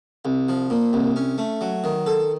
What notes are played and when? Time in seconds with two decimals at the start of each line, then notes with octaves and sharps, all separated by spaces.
0.25 C2
0.49 F3
0.70 A#2
0.93 C2
1.16 C#4
1.38 A3
1.61 F#3
1.84 D#3
2.06 A4